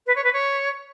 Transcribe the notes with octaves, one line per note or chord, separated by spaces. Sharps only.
B4
C#5
B4
C#5